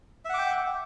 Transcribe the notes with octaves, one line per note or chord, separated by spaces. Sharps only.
E5 F#5 G5 D6